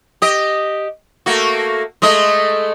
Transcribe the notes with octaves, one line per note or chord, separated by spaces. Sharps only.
G4 D#5
A3 A#3 F#4
G#3 A3 D#5